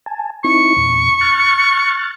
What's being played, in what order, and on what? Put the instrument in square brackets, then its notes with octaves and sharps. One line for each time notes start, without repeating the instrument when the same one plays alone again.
[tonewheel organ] G#5 A5
[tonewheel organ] C4 D#4 E4 [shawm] C#6
[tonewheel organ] E2 A#2
F6 F#6 A6